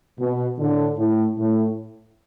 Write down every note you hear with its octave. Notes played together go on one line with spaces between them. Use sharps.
B2
A2 D3
A2
A2